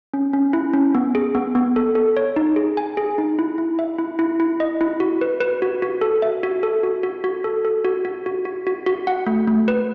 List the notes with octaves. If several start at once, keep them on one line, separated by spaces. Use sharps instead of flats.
C#4
C#4
E4
C#4
B3
G#4
B3
B3
A4
A4
C#5
D#4
G#4
G#5
G#4
D#4
E4
E4
E5
E4
E4
E4
D#5
E4
F#4
B4
B4
F#4
F#4
A4
E5
F#4
A4
F#4
F#4
F#4
A4
A4
F#4
F#4
F#4
F#4
F#4
F#4
F#5
A3
A3
B4